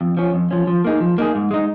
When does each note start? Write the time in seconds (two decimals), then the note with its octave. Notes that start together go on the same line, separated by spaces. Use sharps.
0.01 F2
0.17 F3 C#4
0.34 F2
0.51 F3 C#4
0.67 F3
0.85 A#3 D#4 G#4
1.00 F3
1.18 A#3 D#4 G#4
1.35 G#2
1.51 G#3 D#4